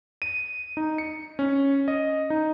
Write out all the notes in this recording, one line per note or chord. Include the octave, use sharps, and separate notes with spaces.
D#7
D#4
C#7
C#4
D#5
D#4